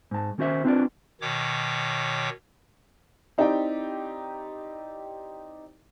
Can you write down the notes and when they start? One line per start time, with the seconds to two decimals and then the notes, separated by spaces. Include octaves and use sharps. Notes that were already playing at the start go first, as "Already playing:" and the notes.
0.11 G#2 A5
0.38 D#3 C#4 F#4 C5 E5
0.65 C4 D4 F4 A#4 B4 D5
1.21 B2 D#3 C#5 D6
3.38 C4 D#4 E4 G4 D5 G5